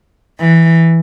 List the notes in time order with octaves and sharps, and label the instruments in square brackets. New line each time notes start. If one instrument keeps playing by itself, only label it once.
[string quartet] E3